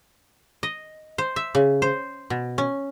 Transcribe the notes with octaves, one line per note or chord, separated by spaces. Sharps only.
D#5
C5
E5
C#3
C5
B2
C#4